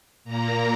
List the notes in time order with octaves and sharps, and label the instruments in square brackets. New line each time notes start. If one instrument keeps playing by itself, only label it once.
[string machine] A#2 A#3 A#5